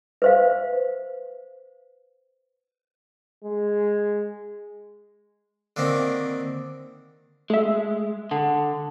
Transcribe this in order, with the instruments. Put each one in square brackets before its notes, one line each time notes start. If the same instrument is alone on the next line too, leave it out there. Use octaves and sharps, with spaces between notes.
[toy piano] B4 C5 F5
[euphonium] G#3
[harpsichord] D3 D#3 A#3 C4
[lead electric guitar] G#3 [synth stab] A3 E5
[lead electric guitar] D3 [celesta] A4 F#5 A5